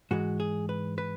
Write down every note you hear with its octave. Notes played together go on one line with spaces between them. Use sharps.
G#2 E3 G#3 F#4
G#4
B4
B4